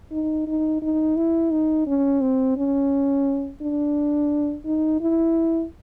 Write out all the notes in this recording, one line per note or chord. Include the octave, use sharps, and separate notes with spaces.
D#4
D#4
D#4
E4
D#4
C#4
C4
C#4
D4
D#4
E4